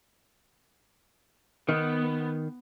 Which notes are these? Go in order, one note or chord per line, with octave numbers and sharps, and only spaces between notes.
D#3 B3